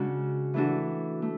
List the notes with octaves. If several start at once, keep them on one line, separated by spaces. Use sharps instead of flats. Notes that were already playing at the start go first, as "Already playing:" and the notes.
Already playing: C#3 G#3 D4 F#4
E3 A3 D4 F#4
A3